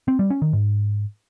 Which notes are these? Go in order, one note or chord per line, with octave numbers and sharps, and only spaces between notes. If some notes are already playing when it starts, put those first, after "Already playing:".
C4
G3
C#4
D#3
G#2